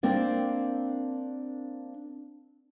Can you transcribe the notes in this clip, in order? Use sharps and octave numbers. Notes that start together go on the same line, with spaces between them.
A#3 C4 D4 A#4